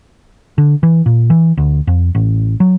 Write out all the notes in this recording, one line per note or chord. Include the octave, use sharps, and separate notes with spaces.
D3
E3
A#2
E3
D2
F2
A1
F#3